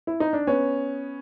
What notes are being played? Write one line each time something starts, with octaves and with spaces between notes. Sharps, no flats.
E4
D#4
D4
B3 C#4